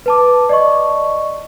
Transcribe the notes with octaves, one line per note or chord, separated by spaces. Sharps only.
B4 A5 D6
D5 D#5 C#6